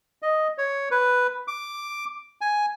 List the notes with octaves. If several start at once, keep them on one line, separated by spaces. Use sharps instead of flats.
D#5
C#5
B4
D6
G#5